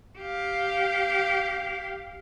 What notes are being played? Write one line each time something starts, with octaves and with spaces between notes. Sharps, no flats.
G4 F5